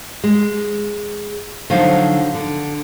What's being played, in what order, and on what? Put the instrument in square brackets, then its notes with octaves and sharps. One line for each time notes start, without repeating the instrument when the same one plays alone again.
[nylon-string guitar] G#3
D3 F3 F#3 D#4 F5
D3